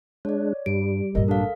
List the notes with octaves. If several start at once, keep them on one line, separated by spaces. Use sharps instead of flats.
G#3 D4 C#5 D5
G2 G3 D7
A#1 G2 A#4 D#5
D4 A4 F5